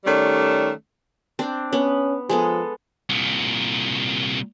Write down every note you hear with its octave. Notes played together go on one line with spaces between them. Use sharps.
D#3 G3 A3 C#4 D5
C4 D4
B3 C#4
F3 G#3 B3 A4
C2 A#2